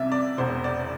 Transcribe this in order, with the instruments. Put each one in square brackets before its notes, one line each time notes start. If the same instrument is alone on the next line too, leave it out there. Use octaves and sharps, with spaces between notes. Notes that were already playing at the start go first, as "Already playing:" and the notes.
Already playing: [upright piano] C2 C3 D5 E5
D5
E1 E2 B2 C5
D5